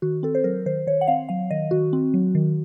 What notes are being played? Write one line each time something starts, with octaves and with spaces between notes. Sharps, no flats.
D#3 F#4
C4 A4
C5
F#3 A#4
D#3 C5
D#3 C#5
F#5
C4 F5
F#3 F5
D#3 D#5
D#3 F#4
C4
F#3
D#3